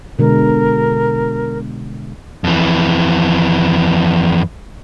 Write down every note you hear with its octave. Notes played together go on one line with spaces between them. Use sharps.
B2 D3 G#3 A#4
F2 E3